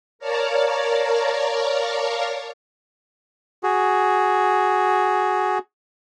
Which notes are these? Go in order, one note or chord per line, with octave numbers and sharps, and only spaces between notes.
A#4 C#5 D5 F5 A5 A#5
F#4 G#4